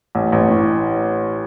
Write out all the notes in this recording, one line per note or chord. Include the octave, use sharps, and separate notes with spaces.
A1
A1
A2